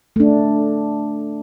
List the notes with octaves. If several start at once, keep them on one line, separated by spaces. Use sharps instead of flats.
A3 D4